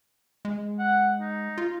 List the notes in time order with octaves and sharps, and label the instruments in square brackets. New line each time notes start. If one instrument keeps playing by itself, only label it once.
[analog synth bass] G#3
[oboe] F#5
D#4
[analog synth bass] F4